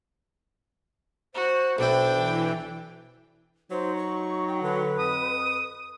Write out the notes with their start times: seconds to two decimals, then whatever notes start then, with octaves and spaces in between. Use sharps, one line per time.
1.34 F#4 C5
1.78 B1 D4 E4 G5
2.14 E3
3.71 F#3 D#4 C5
3.97 C#6
4.48 G5
4.62 D3 B4
4.99 F2 D#6